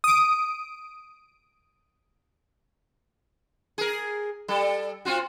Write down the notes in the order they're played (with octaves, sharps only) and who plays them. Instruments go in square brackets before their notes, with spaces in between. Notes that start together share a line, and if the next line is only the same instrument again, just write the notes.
[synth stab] D#6 D7
[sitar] G#4 A#4
G3 A4
C4 F4 F#4